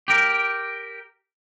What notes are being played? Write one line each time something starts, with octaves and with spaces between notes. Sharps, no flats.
G4 A#4